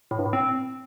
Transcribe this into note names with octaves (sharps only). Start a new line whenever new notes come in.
A2
G2
A2
C4